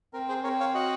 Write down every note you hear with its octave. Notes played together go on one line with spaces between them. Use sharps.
C4 A#4
G#4 C5
C4 A#4 C#5
C#5 F5
F#4 D#5 F#5